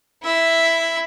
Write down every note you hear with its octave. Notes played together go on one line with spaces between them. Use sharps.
E4 E5